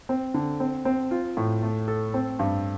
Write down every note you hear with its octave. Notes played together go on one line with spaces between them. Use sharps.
C4
D3
C4
C4
F4
A2
A3
A4
C4
G2